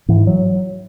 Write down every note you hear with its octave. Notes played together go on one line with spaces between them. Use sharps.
G#2 E3
F#3